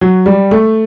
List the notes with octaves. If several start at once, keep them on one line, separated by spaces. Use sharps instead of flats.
F#3
G3
A3